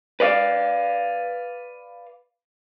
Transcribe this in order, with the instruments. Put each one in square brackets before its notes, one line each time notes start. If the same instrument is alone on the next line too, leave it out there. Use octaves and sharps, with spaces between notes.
[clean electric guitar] B4 D5 F5